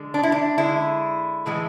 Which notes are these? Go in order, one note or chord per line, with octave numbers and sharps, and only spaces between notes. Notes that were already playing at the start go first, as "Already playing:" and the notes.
Already playing: D3 G#3
D4
E4
D4
D3 G#3 E4
A2 E3 G#3